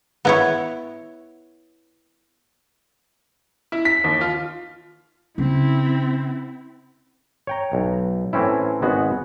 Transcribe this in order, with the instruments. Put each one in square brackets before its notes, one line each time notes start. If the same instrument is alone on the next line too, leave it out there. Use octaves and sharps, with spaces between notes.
[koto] B3 E4 C#5
[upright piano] E4
B6
D#2
F4
[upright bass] C#3 C#4 [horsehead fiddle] C4 E4
[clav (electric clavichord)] C#5 G5 A#5
B1
A2 E3 C4 C#4 E4
G#1 G#3 B3 F#4 F#5